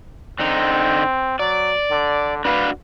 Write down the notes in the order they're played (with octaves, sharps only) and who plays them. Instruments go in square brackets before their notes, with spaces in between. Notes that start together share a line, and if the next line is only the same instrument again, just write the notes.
[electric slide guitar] D3 D#4 [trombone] C4
[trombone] F#3 [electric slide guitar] D5
[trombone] D3
[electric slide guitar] D4 F#4 F5 [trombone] B4